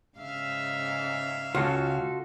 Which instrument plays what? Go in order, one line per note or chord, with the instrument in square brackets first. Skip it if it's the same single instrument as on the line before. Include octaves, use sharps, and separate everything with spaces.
[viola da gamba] G#2 C#3 [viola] E5 F5
[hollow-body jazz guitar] C#2 [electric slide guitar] F4 F#4 A4